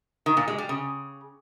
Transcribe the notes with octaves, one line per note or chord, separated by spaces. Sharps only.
D#3
A#2
G#3
G3
C#3